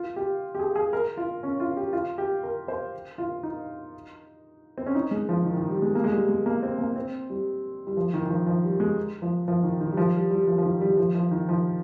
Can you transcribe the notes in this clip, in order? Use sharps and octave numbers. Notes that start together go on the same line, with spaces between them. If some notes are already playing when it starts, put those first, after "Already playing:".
Already playing: F4
G4
G4
G#4
G#4
A#4
F4
C#4
F4
G4
F4
G4
A#4
C5
F4
D#4
C4
C#4
D#4
G#3
F3
D#3
D#3
G3
G#3
A#3
G#3
G3
G#3
A#3
C4
A#3
C4
G3
G3
F3
D#3
D#3
F3
F3
G3
G#3
F3
F3
D#3
D#3
G3
F3
G3
G3
F3
F3
D#3
G3
F3
F3
D#3
F3